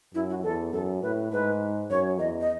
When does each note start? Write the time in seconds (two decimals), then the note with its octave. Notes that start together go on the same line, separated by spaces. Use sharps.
0.14 F#2 E4
0.30 F#4
0.43 E2 A4
0.73 F#2 A4
1.02 A2 B4
1.32 G#2 B4
1.90 F#2 C#5
2.19 E2 D#5
2.41 D#5